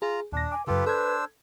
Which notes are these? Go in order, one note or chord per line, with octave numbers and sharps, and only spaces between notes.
F4 G#4 A#5
D#2 A#2 D4 A#6
G#5 D6
F#2 C#3 F4 G4 A4 B4
D4 A4 C5 E6 G#6